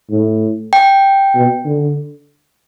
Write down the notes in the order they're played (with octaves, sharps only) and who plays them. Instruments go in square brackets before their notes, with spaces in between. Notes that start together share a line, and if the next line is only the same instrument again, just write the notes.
[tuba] A2
[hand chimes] G5
[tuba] B2
D3